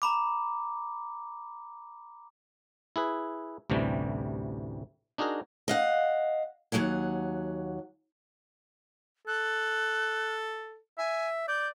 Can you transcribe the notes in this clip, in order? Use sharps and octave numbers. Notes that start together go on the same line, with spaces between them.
A#5 B5 D6
E4 G#4 B4
A1 D2 C3 E3 G3
D4 D#4 F#4 G#4 A#4
D#5 F5 F#5
D#2 G#2 F#3 F#5 G#5
A4 F#6
E5 G#5
D5 G6